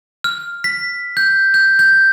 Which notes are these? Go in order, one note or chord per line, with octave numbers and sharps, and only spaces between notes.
F6
B6
G6
G6
G6